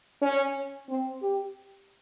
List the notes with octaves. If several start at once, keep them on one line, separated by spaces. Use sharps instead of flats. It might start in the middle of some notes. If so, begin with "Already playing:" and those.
C#4
C4
G4